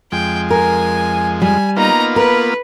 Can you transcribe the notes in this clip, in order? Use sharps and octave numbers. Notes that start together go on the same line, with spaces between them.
F2 G#3 G5
A#4 G#5
G3 G#5
A#3 B3 D#4 F4 A#5
A#4 B4